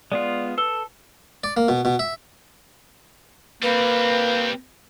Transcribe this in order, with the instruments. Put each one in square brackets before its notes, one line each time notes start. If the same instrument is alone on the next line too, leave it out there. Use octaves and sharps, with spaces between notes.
[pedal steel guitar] G#3 B3 F4 [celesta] D5
[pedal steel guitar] A4 [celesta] B4 E6 G7
[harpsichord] D5
A#3
B2
B2
E5
[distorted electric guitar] G3 C4 [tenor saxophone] A#3 [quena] B4